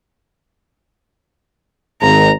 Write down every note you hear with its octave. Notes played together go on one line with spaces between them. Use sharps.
G#1 A#5